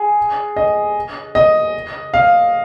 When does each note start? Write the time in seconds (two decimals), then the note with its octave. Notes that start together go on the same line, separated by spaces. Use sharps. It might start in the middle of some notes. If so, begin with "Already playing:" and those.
Already playing: G#4
0.56 D#5
1.35 D#5
2.14 F5